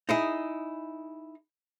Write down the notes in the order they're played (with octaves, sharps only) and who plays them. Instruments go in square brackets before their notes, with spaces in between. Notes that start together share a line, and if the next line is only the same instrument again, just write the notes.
[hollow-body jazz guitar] D#4 E4 G#4